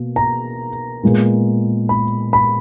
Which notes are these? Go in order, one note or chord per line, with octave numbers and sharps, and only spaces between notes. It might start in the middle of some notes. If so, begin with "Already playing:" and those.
Already playing: B2 A#3
A#5
A#2 G#3 B3
B5
B5